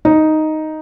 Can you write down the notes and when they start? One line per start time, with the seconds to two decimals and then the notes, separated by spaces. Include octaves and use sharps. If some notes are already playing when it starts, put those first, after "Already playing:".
0.05 D#4